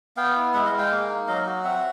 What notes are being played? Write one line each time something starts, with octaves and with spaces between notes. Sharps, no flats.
B3 F5 G5
E4
G#3 E5 F#5
D#5 F5
G#3
F5 G5
A#3
D#4
F#3 D#5 F5
F#4
C4 E5 F#5